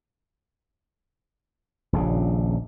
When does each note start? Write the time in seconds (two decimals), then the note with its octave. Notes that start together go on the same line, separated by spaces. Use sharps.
1.93 D#1 A#1 C#3